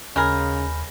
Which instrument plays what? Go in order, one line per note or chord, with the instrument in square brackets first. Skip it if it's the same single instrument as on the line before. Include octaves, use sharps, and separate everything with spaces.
[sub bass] D#2 [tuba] C#3 [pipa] G#3 G#4 A#4 [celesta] G#5 B5 G6